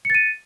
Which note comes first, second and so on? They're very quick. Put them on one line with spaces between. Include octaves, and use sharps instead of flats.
C#7 A6 D#7